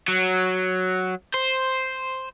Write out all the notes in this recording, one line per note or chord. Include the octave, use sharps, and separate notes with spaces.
F#3
C5